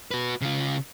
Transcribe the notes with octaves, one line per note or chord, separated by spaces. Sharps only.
F#4 B4
C#3 F4